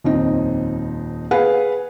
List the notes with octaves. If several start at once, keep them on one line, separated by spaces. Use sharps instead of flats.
D#1 F2 C4 D#4
G#4 B4 F5 F#5